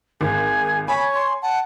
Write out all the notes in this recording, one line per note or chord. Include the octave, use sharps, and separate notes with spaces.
G#1 G#4
C#5 G#5 B5
C6
F#5 A5